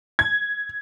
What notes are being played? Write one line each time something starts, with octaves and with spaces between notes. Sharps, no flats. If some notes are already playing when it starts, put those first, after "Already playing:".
G#6